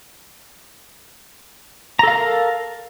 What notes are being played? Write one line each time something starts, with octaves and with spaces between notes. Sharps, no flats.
A4 A#4 F5 A#5